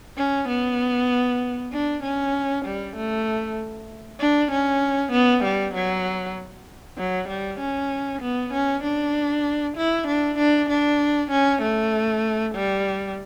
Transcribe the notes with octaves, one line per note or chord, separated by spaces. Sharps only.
C#4
B3
D4
C#4
G3
A3
D4
C#4
B3
G3
F#3
F#3
G3
C#4
B3
C#4
D4
E4
D4
D4
D4
C#4
A3
G3